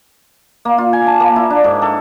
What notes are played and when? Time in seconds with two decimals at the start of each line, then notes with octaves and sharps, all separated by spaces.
0.65 A#3
0.78 F4
0.93 G#5
1.07 A5
1.20 A#3
1.36 E4
1.50 D4
1.64 G#2
1.82 A4